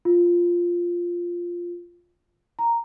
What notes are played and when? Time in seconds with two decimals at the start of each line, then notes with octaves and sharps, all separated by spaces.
0.05 F4
2.59 A#5